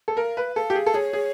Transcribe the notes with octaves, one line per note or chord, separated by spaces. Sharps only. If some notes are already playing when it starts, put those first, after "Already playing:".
A4
A#4 F5
B4
A4 F5
G4
G#4
A4
G#4 C#5
G#4